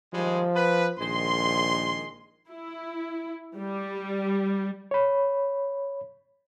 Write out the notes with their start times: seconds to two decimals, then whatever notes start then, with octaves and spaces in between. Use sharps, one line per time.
0.13 D#3 F3 G3 G#3
0.55 B4
0.99 A#1 D#3 G#3 C6
2.50 E4
3.57 G3
4.91 C#5 B5